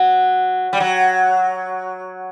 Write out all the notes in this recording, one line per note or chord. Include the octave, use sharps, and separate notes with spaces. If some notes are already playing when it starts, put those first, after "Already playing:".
Already playing: F#3
G3
F#3